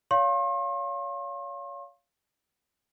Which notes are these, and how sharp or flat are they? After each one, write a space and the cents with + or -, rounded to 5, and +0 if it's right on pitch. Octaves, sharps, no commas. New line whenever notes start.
C#5 +30 F5 +0 C6 +45